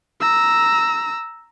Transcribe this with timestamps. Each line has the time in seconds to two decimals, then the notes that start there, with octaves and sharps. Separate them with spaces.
0.21 A#5 E6